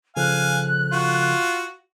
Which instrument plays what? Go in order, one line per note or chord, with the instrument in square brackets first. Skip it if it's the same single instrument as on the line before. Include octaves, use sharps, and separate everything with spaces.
[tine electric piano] C#3 F3 A4 [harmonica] F5 G#5 [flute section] F#6
[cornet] F4 [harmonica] F#4